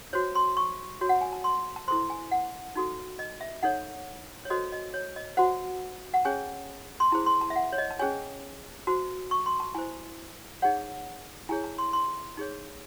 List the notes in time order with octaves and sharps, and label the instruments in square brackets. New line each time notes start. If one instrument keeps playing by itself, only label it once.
[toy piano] F#4 C5 C#5
C6
C#6
F#4 C#5
F#5
G#5
A5
C6
A5
C5 C6
E4 A4
G#5
F#5
D#4 F#4 A4
D#5
E5
D#4 A4 C#5 F#5
C#5
F#4 A4 C5 D#5
D#5
C#5
D#5
F#4 C5 F#5
F#5
C#4 G#4 C#5 G#5
C6
E4 G#4 C5 A5
C6
A5
E5
F#5
C#5
D#5
A5
C#4 G#4 C#5 G#5
F#4 C5 A5
C#6
C6
A5
E4 C5 G#5
D#4 G#4 C#5 F#5
E4 G#4 C#5 G#5
A5
C6
C6
D#4 G#4 C#5